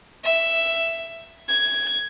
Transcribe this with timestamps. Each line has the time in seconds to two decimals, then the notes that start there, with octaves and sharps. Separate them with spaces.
0.24 E5
1.48 G#6